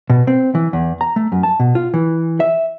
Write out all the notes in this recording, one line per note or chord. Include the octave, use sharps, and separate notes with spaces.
B2
C4
E3
E2
A#5
A3
F#2
A5
B2
F4
E3
E5